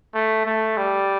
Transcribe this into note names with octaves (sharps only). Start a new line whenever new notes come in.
A3
A3
G3